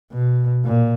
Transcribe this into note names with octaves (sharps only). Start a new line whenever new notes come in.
B2
A#2